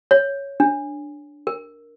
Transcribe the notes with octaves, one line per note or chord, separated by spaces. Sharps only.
C#5
D4
A#4